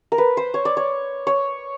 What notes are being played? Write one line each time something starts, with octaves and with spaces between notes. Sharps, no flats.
A#4
B4
C5
C#5
D5
C#5
C#5